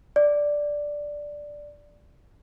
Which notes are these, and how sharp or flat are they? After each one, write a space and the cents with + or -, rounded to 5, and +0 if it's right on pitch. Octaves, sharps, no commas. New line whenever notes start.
D5 +0